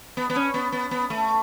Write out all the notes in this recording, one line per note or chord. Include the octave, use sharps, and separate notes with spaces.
B3
B3
C#4
B3
B3
B3
A3